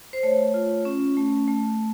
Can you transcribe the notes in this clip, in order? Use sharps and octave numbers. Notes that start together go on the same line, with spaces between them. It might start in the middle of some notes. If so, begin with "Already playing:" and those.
C5
A3 C#5
F4
C#4
A3
A3